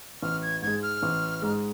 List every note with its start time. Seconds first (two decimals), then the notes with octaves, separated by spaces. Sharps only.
0.22 A1 F6
0.42 G#6
0.62 G#2 G#3 G#6
0.83 F6
1.03 A1
1.42 G#2 G#3